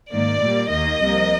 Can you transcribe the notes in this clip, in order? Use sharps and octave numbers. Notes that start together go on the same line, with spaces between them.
G#2 D#3 A#3 D5
A#2 G3 A#3
D#2 D#3 A#3 D#5
C2 C3 F3 A#3